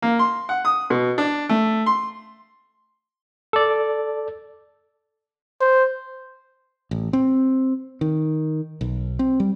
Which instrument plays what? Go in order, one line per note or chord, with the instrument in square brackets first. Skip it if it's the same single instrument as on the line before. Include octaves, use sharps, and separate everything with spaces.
[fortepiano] A#3
C6
F#5
D#6
B2
D4
A3
C6
[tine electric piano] A4 D5
[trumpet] C5
[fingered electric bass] A1
C4
D#3
B1
C4
G3